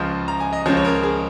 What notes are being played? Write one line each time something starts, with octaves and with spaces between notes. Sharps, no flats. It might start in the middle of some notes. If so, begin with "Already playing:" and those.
Already playing: C#2 C#3 F3
A#5
G#5
D#5
C#2 C#3 F3 C#5
C#5
A#4
G#4